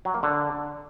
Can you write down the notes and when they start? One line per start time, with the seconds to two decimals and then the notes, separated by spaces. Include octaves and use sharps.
0.05 F#3
0.14 A#3
0.23 D3